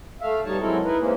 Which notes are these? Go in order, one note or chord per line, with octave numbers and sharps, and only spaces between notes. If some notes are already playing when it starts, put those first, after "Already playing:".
A3 E5 F5
B2 G3 D#4 C#5 A5
F#3 G#3 C4 E4 A4 A#4
D#4 E4 A#4 B4
G#2 C3 E3 G#3 A#3 C#4